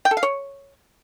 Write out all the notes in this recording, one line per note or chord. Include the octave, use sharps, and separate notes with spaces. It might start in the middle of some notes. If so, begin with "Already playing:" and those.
G5
A4
F5
C#5